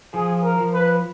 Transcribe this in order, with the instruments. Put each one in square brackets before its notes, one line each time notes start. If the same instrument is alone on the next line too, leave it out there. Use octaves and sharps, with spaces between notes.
[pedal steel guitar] F3 [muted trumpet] G#4
[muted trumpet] A#4
[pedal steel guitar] F3
[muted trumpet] B4